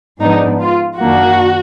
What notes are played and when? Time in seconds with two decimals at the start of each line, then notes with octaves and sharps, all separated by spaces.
0.21 G#2 F3 B3 D4 D#4
0.60 F4
0.99 F#2 D#3 A#3 D4 F#4